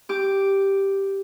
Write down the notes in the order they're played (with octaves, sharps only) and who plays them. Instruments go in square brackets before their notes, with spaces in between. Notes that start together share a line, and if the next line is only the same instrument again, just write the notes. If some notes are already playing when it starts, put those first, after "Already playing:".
[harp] G4 D6